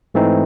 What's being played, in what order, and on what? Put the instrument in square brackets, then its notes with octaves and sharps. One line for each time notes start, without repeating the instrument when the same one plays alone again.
[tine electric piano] G#2 E3 A3 C4 D#4